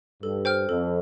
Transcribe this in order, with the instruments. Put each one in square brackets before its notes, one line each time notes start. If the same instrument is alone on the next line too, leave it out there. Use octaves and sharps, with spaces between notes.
[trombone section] G2 [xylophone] A4
[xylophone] C5 G5 F6
[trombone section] F2 [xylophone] A4